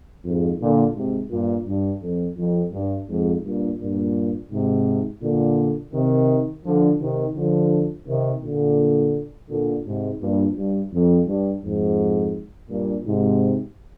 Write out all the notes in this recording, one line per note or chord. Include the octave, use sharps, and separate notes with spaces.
F2 G#2
A#2 D3
G#2 C3
G2 A#2
G2
F2
F2
G2
F2 G#2
G2 A#2
G2 A#2
G#2 C3
A#2 D3
C3 D#3
D3 F3
C3 D#3
D3 F3
C3 D#3
A#2 D3
A#2 D3
G#2 C3
G2 A#2
G2
F2
G2
F2 G#2
G2 A#2
G#2 C3